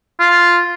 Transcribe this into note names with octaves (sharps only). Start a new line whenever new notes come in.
F4